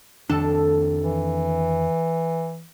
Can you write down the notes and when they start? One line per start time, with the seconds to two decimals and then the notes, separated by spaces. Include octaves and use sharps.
0.30 F2 D#3 D4 A4
1.02 E3